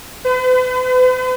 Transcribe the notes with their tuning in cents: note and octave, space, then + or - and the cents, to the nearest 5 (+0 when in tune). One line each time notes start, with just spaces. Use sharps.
B4 +45